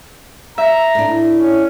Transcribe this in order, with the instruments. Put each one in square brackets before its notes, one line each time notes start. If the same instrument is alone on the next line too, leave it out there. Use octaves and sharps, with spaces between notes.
[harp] E5 [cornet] A#5
[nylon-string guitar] A2 D4
[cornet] C#4